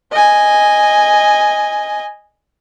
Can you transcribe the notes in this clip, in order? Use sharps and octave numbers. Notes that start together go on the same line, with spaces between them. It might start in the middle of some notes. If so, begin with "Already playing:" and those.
D#5 G#5